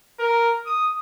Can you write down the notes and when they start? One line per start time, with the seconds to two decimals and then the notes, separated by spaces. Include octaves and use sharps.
0.19 A#4
0.66 D#6